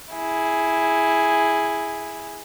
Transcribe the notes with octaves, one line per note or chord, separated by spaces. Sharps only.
E4 G#4